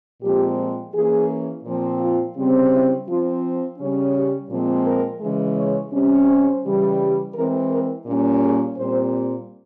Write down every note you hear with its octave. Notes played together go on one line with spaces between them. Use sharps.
A#2 F3 G#3 C4 G4
E3 A#3 C#4 G#4
A#2 F3 C4
F4
C#3 G3 C4
E4
F3 C4 F4
C#3 G3 C#4
G4
A#2 F3 G#3 C4
A#4
C#3 E3 G#3
C#5
C3 G3 C#4
C5
C#3 E3 G3
E3 G#3 C4 A#4
A#4
A#2 G3 A#3 C#4
G#4
A#2 G3 C4 C5